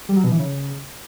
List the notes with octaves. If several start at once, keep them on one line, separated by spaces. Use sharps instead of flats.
G3
F#3
B2
E3
C#3